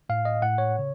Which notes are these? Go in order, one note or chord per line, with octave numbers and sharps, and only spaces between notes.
A2 F5
D#5
A2 F#5
C#5
C#3